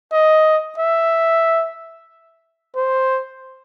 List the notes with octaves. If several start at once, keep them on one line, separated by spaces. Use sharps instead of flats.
D#5
E5
C5